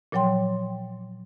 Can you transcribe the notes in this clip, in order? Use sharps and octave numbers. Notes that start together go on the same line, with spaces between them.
A#2 F3 F#3 C#5 G5 C6